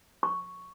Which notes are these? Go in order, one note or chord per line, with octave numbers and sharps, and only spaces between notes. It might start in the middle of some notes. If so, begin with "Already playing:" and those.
C#6